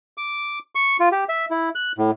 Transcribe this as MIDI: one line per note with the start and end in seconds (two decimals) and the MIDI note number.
0.18 0.59 86
0.75 0.97 85
1.00 1.09 65
1.12 1.24 67
1.29 1.46 76
1.51 1.69 64
1.75 1.92 90
1.98 2.11 45